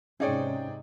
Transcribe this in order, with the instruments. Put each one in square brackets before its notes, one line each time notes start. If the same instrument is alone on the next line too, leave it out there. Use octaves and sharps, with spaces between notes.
[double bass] G#2 C3 [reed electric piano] C#4 [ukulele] D#4 C#5 [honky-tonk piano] G#4 D5 G5